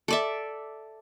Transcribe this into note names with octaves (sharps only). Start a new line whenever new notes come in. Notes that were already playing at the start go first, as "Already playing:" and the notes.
A4 D5 E5